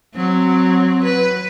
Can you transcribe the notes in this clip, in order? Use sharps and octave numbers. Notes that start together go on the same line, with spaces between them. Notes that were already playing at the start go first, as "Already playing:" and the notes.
F#3 C4
B4